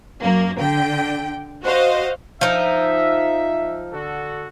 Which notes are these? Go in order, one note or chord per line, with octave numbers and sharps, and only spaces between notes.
F#2 A#3
D3 G5
F#4 C5 D#5 F5
F3 D#4 E5
D3 F#4 A4